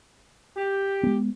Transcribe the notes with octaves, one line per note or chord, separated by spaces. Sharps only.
G4
G#3 B3